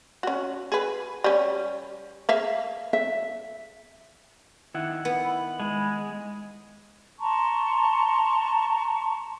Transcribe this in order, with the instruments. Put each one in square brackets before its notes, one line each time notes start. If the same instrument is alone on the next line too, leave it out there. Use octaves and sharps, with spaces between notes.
[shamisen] C#4 F#4
G#4 B4
G3 C#4
G#4 E5 F5
[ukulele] E5
[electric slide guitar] D#3 E4 F#5
[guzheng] B3
[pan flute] B5
[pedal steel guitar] G#3
[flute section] A5 A#5 C6 C#6